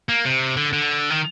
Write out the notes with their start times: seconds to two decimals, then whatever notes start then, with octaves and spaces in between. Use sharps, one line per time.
0.09 A#3
0.25 C3
0.57 D3
0.73 D3
1.10 D#3